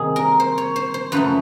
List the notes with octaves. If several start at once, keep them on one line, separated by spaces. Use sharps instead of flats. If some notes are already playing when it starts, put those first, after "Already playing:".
Already playing: C3 D#3 G3 A#3 G#4
A#4
C5
C#5
C5
C5
F#2 C#3 F3 A3 B4